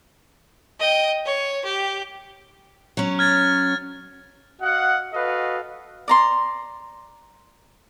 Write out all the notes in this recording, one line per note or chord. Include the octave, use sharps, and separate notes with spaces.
D#5 G5
C#5
G4
F#3 C#4
F6 G#6 A6
F#4 D#5 F5 F#5
F#4 A4 B4 D#5 F5
D5 A#5 C6